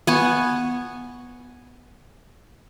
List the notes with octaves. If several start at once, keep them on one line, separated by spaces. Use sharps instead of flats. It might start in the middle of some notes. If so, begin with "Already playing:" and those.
B3 G#5 C#6